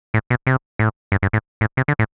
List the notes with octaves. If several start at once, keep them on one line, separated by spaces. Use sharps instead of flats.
A2
B2
C3
A2
G2
G2
A2
A2
C3
D3
A2